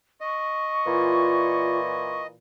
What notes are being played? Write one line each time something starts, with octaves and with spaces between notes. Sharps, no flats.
D#5 C#6
A#2 E3 F4